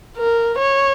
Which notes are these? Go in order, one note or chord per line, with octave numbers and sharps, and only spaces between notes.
A#4
C#5